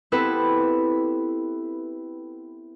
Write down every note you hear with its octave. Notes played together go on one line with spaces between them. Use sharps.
B3 C4 E4 G4 A4 B4